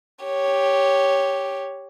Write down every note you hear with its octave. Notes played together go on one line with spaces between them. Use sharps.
G4 C#5